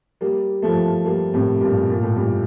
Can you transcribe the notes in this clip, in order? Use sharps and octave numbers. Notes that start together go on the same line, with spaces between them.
G3 A#3
F3 A3
G3 A#3
A2 C3
G2 A#2
A#2
A2
G2 A#2